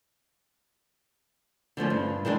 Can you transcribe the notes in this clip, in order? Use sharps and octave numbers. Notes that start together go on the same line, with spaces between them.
D3 F3 A3 C#4
G2
D#3 E3 G#3 D4